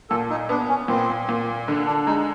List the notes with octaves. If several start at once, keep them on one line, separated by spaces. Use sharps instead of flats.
A#2 A4
D#4
B3 D4
C#4
A#2 C4
A#2
D3
D4
G#3 D#4